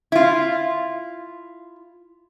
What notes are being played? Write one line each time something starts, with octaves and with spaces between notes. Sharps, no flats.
E4 F4